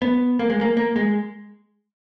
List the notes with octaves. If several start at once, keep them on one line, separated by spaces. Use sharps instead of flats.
B3
A#3
G#3
A#3
A#3
G#3